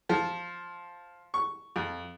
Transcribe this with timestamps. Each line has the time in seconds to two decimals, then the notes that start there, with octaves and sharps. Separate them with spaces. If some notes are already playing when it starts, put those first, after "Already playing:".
0.09 F3
1.34 C#6
1.76 F2